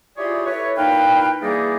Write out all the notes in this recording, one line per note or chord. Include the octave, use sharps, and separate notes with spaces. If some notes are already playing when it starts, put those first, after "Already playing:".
E4 F4 G4 G#4 C#5 D5
E4 A4 B4 C#5
A#2 D#4 E4 B4 F5 G5
E3 G3 A#3 D4 D#4 G#4